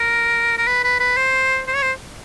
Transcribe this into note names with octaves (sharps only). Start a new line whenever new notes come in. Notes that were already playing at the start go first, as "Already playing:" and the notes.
Already playing: A#4
A#4
B4
B4
B4
C5
C5
C#5
C5